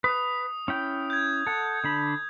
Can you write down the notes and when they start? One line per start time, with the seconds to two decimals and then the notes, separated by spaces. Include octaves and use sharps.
0.04 B4 D#6
0.68 C#4 E4 G5
1.10 G6 G#6
1.47 A4 F#5
1.84 D3 D4 B5